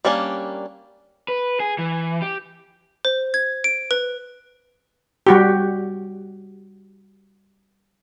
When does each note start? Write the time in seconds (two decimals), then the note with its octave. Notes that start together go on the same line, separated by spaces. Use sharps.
0.05 G3 A#3 C#4 D4
1.28 B4
1.60 G#4
1.78 E3
2.22 G4
3.05 C5
3.34 G#6
3.64 D7
3.91 B4
5.27 G3 F#4 G4